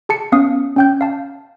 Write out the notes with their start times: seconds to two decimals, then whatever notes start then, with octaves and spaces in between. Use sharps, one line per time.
0.09 G#4 A5 C#7
0.32 B3 C#4 F5 D#6
0.76 C#4 G5 G6
1.01 F5 A5